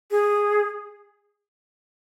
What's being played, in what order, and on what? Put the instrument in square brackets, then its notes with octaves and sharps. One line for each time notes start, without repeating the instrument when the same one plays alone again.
[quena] G#4